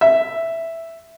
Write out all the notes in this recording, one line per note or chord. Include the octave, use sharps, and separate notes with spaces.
E5